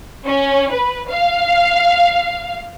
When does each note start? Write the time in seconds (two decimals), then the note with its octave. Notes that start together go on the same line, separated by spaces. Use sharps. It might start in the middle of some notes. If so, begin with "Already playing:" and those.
0.26 C#4
0.71 B4
1.09 F5